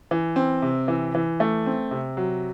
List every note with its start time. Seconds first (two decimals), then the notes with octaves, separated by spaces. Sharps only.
0.11 E3
0.36 C4
0.62 C3
0.88 E3
1.15 E3
1.40 A3
1.66 C4
1.91 C3
2.17 F#3